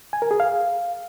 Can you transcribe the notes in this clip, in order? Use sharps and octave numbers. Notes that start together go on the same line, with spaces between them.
G#5
A#4
G#4
F5